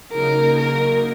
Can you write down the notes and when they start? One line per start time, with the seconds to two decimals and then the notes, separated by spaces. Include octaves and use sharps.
0.12 C#3 F#3 A#3 D#4 A#4
0.58 A#4